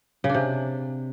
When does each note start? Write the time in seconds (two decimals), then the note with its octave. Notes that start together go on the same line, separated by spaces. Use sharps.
0.24 C#3
0.29 D4
0.34 C3